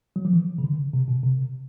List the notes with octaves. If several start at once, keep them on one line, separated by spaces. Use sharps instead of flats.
F#3
F3
E3
C#3
D3
C3
B2
C3